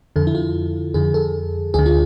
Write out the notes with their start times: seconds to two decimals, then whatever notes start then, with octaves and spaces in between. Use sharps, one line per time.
0.16 F2 D3 A4
0.27 E4
0.35 F4
0.94 F2 D3 G#4
1.14 A4
1.74 D2 D3 G#4
1.86 F4